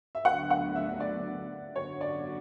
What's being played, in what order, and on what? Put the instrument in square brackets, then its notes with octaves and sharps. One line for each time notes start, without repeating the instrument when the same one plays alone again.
[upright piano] E5
[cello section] D2 D3 F#3 B3 [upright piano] F#5
[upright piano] F#5
E5
D5
[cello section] F#2 D3 F#3 B3 F#4 [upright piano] C#5
[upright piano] D5